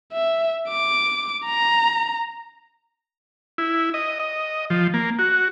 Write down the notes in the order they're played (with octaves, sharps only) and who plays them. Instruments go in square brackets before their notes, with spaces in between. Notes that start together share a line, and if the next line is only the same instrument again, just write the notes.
[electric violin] E5
D6
A#5
[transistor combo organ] E4
D#5
D#5
F3
A#3
F#4